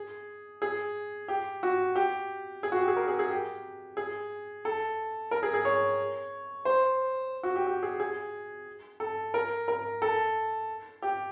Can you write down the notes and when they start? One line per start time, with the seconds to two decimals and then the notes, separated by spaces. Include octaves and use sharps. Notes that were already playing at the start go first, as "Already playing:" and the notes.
Already playing: G#4
0.62 G#4
1.28 G4
1.63 F#4
1.96 G4
2.63 G#4
2.72 F#4
2.80 G4
2.88 G#4
2.97 A#4
3.08 G#4
3.19 G#4
3.30 G4
3.97 G#4
4.65 A4
5.31 A#4
5.43 G#4
5.54 G#4
5.65 C#5
6.65 C5
7.43 F#4
7.56 G4
7.67 G4
7.83 G#4
8.00 G#4
9.00 A4
9.34 A#4
9.68 A#4
10.02 A4
11.02 G4